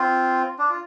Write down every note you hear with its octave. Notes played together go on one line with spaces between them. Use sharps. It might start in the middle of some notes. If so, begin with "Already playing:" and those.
Already playing: C4 F4
D4
F4